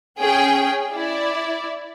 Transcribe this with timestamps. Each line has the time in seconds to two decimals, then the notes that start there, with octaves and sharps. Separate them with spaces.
0.20 C#4 G#4 G5
0.92 E4 D5